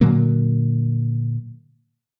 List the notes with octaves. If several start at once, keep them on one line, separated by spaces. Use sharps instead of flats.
A#2 D3 F#3 A#3